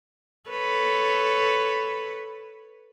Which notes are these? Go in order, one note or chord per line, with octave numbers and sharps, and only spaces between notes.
A4 B4 C#5